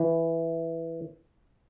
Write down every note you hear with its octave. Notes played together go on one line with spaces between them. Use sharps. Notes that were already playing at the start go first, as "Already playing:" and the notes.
Already playing: E3